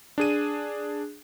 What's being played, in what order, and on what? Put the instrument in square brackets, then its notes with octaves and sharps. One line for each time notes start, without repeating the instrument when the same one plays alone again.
[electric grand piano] D4 G#4 D#7